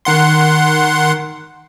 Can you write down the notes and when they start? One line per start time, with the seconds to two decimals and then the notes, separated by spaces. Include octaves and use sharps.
0.05 D#3 F#5 C6